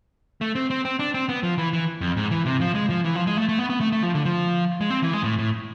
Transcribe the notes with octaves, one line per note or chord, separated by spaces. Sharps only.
A3
C4
C4
C4
D4
C4
B3
F3
E3
E3
F2
G#2
E3
C3
F3
G#3
F3
E3
F3
G#3
A3
A3
B3
B3
A3
A3
F3
D3
F3
G#3
C4
E3
G#3
A2
A2